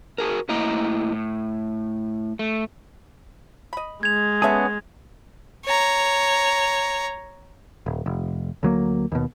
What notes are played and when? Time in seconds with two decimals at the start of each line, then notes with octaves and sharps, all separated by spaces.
0.18 F#4 G#4 A#4
0.49 A2 A#3 E4 D#5 G5 A#5
1.12 A2
2.39 A3
3.73 D#5 B5
4.03 G#3 G#6 F7
4.42 B3 C#4 G#4 A4 B4 E5
5.65 C#5 A#5
7.86 D#1
8.06 F1
8.63 D2 F#3 A#3
9.12 D#2 B2